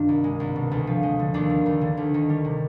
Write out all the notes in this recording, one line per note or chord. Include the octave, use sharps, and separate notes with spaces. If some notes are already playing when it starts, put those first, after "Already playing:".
Already playing: G2 D#3 D4 F4
C2
G#3
C2
B2
D2
F3
G#3
D3
D#2 D4
G3
D#2
D3
D2
D#3
G3
C3